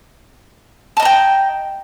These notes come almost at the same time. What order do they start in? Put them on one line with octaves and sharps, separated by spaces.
A5 D#5 A#5 G5